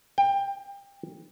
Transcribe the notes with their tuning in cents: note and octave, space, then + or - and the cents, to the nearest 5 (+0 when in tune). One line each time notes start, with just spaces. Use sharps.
G5 +20